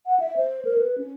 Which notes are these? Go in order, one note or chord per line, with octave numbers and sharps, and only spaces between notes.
F#5
E5
C5
A#4
B4
C#4